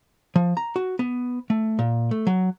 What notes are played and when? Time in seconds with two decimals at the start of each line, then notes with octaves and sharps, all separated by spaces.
0.36 F3
0.57 A#5
0.76 F#4
0.99 B3
1.50 A3
1.79 A#2
2.11 A3
2.27 F#3